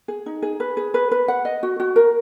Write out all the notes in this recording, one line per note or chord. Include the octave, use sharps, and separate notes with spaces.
G#4
D#4
G#4
B4
G#4
B4
B4
F#5
D#5
F#4
F#4
A#4